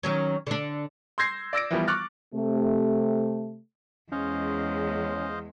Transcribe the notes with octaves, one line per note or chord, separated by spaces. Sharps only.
D#3 F#3 C#4
D3 D4
C6 E6 G6 G#6 A#6 C7
D5 E6 A#6 D7
E3 F3 G3 B3
C#6 D6 F6 F#6 A6
C3 A3
E2 G#3 C#4 C5 D#5 F5